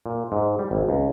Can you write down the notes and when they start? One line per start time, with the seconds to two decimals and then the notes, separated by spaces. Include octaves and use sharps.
0.06 A#2
0.32 G#2
0.59 G3
0.71 G#1
0.89 C#2